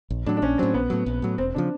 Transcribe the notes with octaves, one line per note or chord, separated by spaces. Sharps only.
A#1
A2 F#3 D4
D4
A#1 C#4
A2 F#3 C4
A#1 B3
A2 F#3
A#1
A2 F#3
E1 C4
C#3 F3 D4